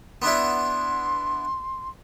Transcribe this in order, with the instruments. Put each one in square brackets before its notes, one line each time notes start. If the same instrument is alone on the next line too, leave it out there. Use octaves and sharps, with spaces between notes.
[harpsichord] B3 D4 E4 [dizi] C6